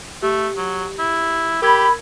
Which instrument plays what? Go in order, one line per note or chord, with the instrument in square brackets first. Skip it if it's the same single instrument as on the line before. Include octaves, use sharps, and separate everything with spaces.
[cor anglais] A3 [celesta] G4
[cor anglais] F#3
E4
[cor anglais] G4 [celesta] A#4 E6 G#6 [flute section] B5